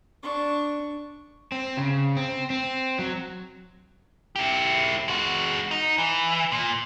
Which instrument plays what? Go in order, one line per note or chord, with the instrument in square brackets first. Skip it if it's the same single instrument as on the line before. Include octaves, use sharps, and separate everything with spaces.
[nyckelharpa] D4 C#6
[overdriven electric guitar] C4
C#3
C4
C4
F#3
[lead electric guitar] E4 G4
G#3 F#4
D#4
E3
A#2